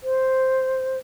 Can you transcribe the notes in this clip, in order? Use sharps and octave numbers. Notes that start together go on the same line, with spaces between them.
C5